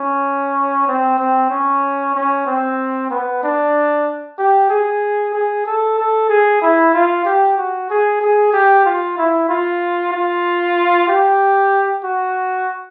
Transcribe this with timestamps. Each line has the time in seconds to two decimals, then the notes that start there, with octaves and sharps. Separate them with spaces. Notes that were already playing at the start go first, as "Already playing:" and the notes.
Already playing: C#4
0.88 C4
1.19 C4
1.50 C#4
2.15 C#4
2.46 C4
3.10 B3
3.43 D4
4.38 G4
4.70 G#4
5.34 G#4
5.66 A4
5.99 A4
6.29 G#4
6.62 E4
6.94 F4
7.25 G4
7.58 F#4
7.90 G#4
8.21 G#4
8.53 G4
8.86 F4
9.18 E4
9.49 F4
10.12 F4
11.08 G4
12.04 F#4